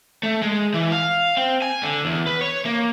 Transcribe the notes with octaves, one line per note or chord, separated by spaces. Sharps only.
A3
G#3
E3
F5
C4
G#5
D3
E2
B4
C#5
A#3